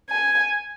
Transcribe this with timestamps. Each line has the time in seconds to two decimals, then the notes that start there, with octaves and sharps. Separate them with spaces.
0.10 G#5